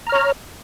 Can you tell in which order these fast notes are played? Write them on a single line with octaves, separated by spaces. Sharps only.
A#5 F6 C#5